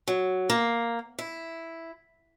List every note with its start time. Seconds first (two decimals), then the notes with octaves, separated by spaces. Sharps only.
0.08 F#3
0.50 A#3
1.19 E4